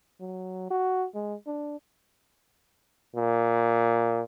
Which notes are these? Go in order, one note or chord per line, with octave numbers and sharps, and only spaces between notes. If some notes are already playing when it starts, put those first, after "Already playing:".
F#3
F#4
G#3
D4
A#2